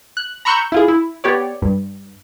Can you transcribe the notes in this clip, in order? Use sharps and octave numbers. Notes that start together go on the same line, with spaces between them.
F#6
A#5 B5 C#6 E6 F#6 G6
E4 F4 G#4
E4
B3 G4 C#5 D5
G2